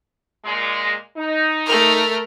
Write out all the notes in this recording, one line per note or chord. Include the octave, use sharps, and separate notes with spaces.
A#2 G#3
D#4
A3 A#4